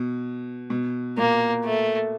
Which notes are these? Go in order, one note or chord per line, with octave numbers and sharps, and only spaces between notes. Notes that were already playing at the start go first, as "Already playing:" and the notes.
Already playing: B2
B2
A#2 A#3
A3